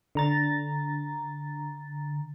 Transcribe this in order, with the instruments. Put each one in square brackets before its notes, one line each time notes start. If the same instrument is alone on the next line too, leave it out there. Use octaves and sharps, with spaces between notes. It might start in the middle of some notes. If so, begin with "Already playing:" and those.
[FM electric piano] D3 A#5 A6